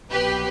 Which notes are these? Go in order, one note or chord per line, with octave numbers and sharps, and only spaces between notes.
C2 B2 F#3 G4 B4